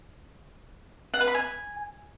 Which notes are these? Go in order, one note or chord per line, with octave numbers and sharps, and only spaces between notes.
F#5
B4
B5
G#5